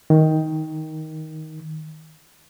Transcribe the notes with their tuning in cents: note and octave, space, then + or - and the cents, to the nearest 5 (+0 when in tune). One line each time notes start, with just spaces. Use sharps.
D#3 +10